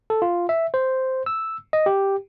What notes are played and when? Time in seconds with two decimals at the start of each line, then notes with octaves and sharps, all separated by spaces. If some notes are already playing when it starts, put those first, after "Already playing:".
0.10 A4
0.22 F4
0.49 E5
0.74 C5
1.26 E6
1.73 D#5
1.86 G4